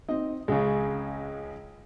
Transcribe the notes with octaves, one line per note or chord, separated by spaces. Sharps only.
C4 D#4 D#5
C#2 C#3 G#3